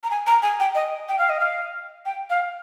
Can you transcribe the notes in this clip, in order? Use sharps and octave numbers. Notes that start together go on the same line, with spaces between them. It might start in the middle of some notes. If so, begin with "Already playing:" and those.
A#5
G#5
A#5
G#5
G5
D#5
G5
F5
D#5
F5
G5
F5